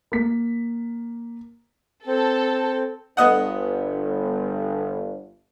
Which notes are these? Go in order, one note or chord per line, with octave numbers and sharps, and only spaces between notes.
A#3 B6
C4 A4
G1 B3 D#5 F#5